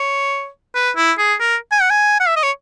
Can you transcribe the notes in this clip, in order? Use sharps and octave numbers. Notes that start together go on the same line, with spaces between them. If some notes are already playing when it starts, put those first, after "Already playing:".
Already playing: C#5
B4
E4
G#4
A#4
G#5
F#5
G#5
F#5
E5
D#5
C#5